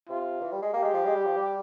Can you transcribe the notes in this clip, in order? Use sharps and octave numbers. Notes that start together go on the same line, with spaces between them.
C3 F4
E3
G3
G#3
A#3 G4
G#3
F3
G#3
G3
F3
G3